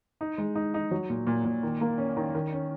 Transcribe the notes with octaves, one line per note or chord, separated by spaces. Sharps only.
D#4
G#3
D#4
D#4
F#3
A#2
A#2
A#2
D#3
A#3
C#4
D#3
D#3
C#4